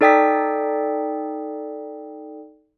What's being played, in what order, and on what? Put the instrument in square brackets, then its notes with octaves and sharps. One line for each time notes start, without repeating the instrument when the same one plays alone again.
[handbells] D#4 A4 D5 G5 D#6 B6